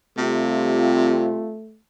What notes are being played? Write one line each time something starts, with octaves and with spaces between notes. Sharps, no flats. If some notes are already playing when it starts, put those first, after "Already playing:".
C3 G3 A3 C4 F4